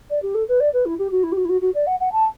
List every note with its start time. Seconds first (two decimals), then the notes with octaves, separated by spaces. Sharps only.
0.10 D5
0.23 G4
0.35 A4
0.49 B4
0.60 D5
0.74 B4
0.86 E4
0.99 G4
1.12 F#4
1.24 E4
1.32 G4
1.37 F#4
1.45 E4
1.49 F#4
1.61 F#4
1.75 D5
1.87 F#5
2.00 F#5
2.12 A5